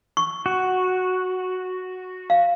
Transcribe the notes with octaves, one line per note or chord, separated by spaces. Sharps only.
C#6
F#4
F5